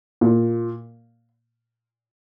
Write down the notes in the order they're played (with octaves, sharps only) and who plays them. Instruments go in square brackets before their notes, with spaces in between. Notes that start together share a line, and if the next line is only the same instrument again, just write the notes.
[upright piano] A#2